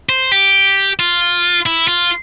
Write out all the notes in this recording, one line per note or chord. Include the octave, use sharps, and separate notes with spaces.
C5
G4
F4
E4
F4